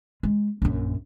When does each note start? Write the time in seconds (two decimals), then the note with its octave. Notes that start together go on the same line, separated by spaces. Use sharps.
0.23 G#3
0.62 A#1 F#2